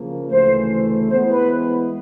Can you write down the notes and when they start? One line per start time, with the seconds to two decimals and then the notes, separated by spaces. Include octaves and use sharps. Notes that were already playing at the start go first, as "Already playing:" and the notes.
Already playing: C#3 F3 A#3
0.29 D2 C#3 E3 A3 C5
1.09 E3 G#3 B3 E4 C5
1.29 B4